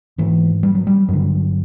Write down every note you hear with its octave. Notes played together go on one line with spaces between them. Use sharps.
G#2 E3
G3
F#3
G3
G2 D3 F#3